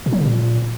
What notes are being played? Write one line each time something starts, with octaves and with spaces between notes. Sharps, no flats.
B2
F#3
C#3
A#2